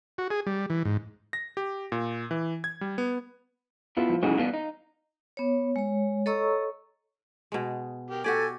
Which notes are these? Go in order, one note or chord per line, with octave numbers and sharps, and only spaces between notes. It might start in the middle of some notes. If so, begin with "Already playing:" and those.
F#4
G#4
G3
E3
G#2
A#6
G4
A#2
E3
G#6
G3
B3
B2 B3 E4 F4
F3
B1 C#3 E3 G#3 F#4
G2 B2 B3 F5
D#4
B3 C#5
G#3 C#5
A4 C#5 D#5 A#5 C#6 E6
B2 G#3
G4 A#4
F#4 G4 A4 D5 G#5